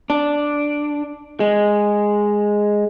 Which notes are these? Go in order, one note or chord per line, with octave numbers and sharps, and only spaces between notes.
D4
G#3